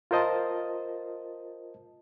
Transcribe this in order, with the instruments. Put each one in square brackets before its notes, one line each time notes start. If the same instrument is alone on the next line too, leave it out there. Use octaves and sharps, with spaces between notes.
[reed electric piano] F4 A#4 C5 D#5 A5